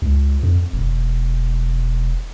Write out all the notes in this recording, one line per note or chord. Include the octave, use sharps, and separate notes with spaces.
C#2
F2
E1